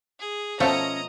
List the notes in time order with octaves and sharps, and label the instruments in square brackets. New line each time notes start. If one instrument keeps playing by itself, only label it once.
[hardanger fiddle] G#4
[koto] B2 F3 A3 [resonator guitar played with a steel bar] C#4 C#5 [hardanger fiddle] D#5 A#5